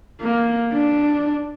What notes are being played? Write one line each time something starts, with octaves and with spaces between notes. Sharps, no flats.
A#3
D4